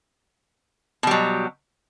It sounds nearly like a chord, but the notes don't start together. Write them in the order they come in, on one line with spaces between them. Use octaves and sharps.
B2 G3 F#3